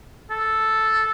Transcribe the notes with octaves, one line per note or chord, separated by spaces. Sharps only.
A4